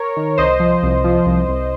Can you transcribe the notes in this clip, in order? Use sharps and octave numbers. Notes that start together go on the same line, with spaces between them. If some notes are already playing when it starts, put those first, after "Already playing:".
Already playing: A#4 C#5
D#3
C2 C5 D#5
F3
C2
F3
C2
C2